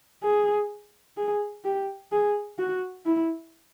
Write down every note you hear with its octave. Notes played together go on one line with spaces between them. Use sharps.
G#4
G#4
G4
G#4
F#4
E4